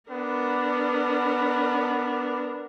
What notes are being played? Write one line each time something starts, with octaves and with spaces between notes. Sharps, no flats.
B3 D4 A#4